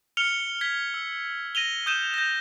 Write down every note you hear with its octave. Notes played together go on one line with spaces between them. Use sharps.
F6 C#7 F7 G7
G#6 B6 G7
E6
A#6 D#7 F7 G7
D#6 G6 D#7 E7
G6 A#6